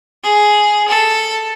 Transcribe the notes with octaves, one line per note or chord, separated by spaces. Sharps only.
G#4
A4